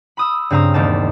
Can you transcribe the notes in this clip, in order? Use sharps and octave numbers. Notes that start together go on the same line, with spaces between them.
B5 D#6 E6
G2 C#3 C4 F5 A#5 D#6
E1 D#2 G3 A5